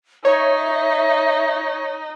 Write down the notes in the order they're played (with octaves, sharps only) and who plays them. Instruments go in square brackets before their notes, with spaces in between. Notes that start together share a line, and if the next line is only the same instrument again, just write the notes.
[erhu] D#4 [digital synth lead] C#5 [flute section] E5